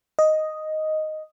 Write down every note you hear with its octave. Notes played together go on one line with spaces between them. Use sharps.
D#5